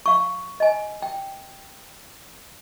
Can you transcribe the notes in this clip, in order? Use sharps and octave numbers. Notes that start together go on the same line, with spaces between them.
F5 C#6
D#5 G#5
G5